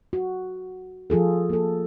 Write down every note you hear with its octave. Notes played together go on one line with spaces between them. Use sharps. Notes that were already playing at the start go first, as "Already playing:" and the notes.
F#4
F3 F4 G#4 A4
A#3 A4